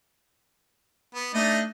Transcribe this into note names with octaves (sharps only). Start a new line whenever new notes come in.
B3
A3 D4 D#4 D#5